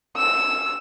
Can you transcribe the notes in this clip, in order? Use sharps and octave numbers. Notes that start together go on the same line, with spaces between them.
E6